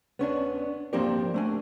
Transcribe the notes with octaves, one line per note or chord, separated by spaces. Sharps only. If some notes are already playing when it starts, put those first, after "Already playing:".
B3 C#4 D4
F3 A#3 C4 D4 G4 A#4
A3 D4 G#5